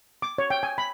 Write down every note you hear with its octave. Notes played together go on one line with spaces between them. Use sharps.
D6
C#5
G5
G#5
B5